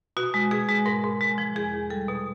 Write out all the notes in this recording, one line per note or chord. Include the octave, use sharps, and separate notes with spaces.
B2 F#4
G#3
B2 G#4
G#3
G#2 A#4
G#2
G#3
F3
E2 G#4
E2
G3 A4
B2